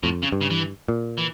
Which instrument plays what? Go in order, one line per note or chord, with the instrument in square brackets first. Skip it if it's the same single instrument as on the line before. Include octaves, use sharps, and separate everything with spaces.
[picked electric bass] F2 [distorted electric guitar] A2
[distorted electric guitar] C#3
[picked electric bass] G2
[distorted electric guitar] C#3
E3
[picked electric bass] A#2
[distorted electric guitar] E3